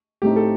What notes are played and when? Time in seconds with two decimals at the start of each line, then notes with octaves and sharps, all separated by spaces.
0.22 A2 A3 C4 D#4 G4
0.36 A4